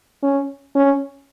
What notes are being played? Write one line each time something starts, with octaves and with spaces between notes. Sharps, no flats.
C#4
C#4